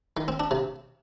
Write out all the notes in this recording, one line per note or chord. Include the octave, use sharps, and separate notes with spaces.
D#3
C4
D4
C3